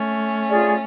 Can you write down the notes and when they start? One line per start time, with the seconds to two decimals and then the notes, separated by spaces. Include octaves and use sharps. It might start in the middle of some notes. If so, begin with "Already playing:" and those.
Already playing: A3 C#4
0.49 F4 G#4 D5